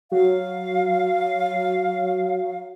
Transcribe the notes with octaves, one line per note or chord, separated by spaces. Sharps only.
F#3 F5